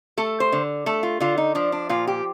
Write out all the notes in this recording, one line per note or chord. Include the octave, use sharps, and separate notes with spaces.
A3 A4
C5
D3
A3 A4
F4
D3 F4
D#4
F3 D4
D4
A#2 F4
G4